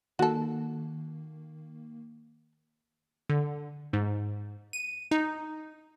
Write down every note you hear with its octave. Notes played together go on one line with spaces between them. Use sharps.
D#3 A#3 F#4 A4
D3
G#2
D#7
D#4